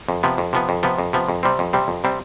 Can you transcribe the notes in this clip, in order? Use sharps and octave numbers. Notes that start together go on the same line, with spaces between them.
F2
C3 F3 B3
F2
C3 F3 B3
F2
C3 F3 B3
F2
C3 F3 B3
F2
C3 G3 C4
F2
C3 G3 C4
F2
C3 G3 C4